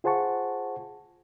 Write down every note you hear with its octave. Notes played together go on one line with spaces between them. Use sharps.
F4 G#4 C5 F#5 A5 C#6